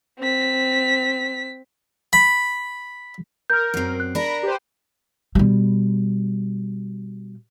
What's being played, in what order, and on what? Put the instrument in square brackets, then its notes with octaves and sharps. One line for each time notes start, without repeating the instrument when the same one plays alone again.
[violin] C4 B6
[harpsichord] B5
[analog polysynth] A#4 [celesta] F6 G6
[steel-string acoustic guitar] F#2 C4
[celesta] F#6
[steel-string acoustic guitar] D4 A#4 [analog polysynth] B5 A#6
[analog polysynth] G4 B4 C5
[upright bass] B2 G3